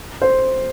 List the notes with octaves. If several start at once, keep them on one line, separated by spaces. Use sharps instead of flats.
C5